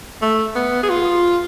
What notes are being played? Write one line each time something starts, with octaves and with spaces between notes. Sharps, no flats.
A3
B3
G#4
F4